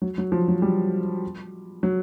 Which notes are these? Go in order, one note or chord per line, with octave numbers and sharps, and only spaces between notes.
F#3
F#3
F3
F#3
G3
F#3